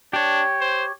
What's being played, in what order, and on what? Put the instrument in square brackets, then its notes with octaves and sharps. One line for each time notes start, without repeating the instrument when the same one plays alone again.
[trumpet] D4 [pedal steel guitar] G4 C#5
[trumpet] C5